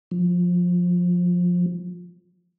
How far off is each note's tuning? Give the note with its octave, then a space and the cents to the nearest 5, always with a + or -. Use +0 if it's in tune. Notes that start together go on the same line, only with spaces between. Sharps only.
F3 +20